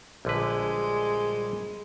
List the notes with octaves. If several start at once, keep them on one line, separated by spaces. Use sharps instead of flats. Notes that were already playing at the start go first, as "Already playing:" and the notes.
A#1 D3 G3 G#3 B4